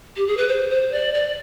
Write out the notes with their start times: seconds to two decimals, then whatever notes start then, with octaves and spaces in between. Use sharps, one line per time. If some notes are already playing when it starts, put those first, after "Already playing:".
0.16 G4
0.27 G#4
0.37 B4
0.48 C5
0.70 C5
0.92 D5
1.14 D5